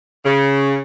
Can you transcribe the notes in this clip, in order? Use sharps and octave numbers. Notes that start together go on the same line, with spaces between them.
C#3